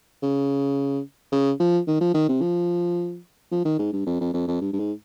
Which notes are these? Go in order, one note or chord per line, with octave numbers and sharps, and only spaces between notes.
C#3
C#3
F3
D#3
F3
D#3
C3
F3
F3
D#3
G#2
G2
F2
F2
F2
F2
G2
G2
G#2